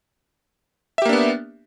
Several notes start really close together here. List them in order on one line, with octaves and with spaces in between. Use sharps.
E5 G4 A#3 D4 B3